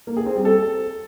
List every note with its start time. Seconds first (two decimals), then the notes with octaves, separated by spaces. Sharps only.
0.07 A#3
0.17 G#4
0.26 C4
0.36 G3
0.45 A4